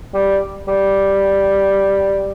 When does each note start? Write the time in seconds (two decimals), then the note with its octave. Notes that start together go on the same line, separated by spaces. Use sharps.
0.14 G3
0.68 G3